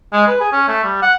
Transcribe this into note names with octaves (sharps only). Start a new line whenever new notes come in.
G#3
B4
G#4
C#4
A3
G3
F#5